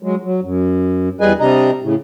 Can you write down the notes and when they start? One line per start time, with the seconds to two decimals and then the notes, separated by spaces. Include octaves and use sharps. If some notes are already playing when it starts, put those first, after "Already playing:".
0.03 F#3 G#3
0.23 F#3
0.43 F#2
1.21 E2 G3 G#4 B4 D#5 G#5
1.40 C3 G3 D4 D#5 A#5
1.83 A2 C#3